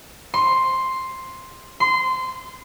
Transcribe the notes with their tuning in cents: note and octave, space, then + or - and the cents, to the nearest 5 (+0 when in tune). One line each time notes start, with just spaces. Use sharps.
C6 +5
C6 -20